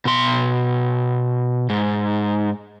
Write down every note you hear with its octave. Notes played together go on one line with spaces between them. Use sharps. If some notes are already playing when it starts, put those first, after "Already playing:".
B2 C6
G#2